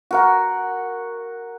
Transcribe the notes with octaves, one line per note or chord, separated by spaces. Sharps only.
F#4 A#4 F#5